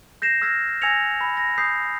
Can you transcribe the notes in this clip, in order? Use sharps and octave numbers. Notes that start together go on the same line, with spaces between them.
G6 A#6 C7 E7
E6 F6 G#6 A#6 B6
G#5 E6 G#6 A#6 C#7 F7
B5
A#6
D#6 G6 B6 C7